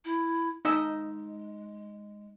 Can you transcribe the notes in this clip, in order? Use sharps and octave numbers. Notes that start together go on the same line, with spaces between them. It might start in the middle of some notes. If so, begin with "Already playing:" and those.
E4
G#3 D#4 D#5 E6